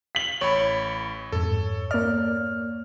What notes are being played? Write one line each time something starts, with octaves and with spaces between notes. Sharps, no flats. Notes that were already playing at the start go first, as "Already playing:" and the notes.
B6 F#7
A1 C#5 B5
F2 G#2 A4
A#3 D5 F6